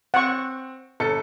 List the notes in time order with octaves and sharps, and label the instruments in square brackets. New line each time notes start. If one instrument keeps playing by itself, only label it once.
[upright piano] C4 [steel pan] F#5 C#6
[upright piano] G1 A4 C#7